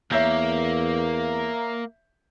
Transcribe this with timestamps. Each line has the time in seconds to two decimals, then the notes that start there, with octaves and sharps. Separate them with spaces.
0.12 E2 A#3 C#5 E5 G6